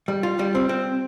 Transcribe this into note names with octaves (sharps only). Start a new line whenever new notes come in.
G3
F4
G3
C4
C4